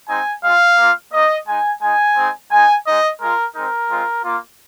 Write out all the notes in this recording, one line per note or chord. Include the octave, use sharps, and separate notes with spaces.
G#3 C4 D#4 G#5
G#3 F4 F5
A#3 F4
A#3 D#4 D#5
G#3 D#4 G#5
G#3 D#4 G#5
G#3 C4 D#4
G#3 D#4 G#5
G#3 D#4 D#5
G#3 F4 A#4
G#3 C4 D#4 A#4
G#3 C4 F4
A#3 F4